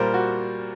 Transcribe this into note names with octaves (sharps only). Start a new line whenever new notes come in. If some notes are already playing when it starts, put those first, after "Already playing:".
Already playing: A#2 G3 A#3 A#4 C5
F#4